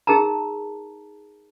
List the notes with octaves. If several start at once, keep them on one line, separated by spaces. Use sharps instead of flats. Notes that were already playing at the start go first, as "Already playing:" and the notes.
D#4 G#4 A#4 A5 A#5